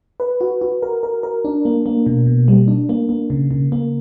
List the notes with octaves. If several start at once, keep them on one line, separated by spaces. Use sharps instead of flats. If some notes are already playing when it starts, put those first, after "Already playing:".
B4
F#4
F#4
A#4
A#4
A#4
D4
A#3
A#3
B2
B2
G3
D4
A#3
A#3
C#3
C#3
A#3